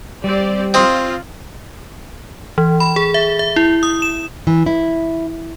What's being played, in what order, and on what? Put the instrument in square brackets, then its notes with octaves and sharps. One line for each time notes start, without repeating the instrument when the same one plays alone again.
[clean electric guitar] G3 [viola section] C4 G4 D5
[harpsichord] C4 D#5 [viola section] F4
[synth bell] E3
B5
G#4
E5
E5
E4
D#6
E7
[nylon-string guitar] E3
E4